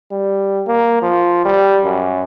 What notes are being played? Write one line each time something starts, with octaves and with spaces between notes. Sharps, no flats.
G3
A#3
F3
G3
F#2